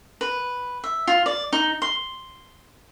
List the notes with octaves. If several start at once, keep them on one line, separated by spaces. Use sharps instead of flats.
B4
E5
F4
D5
D#4
C6